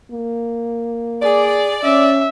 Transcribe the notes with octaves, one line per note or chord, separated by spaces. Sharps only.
A#3
G#4 D5
C#4 E5